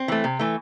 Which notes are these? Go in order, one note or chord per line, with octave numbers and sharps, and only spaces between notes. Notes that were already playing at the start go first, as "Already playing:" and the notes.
Already playing: C4
E3 A3
C3
E3 A3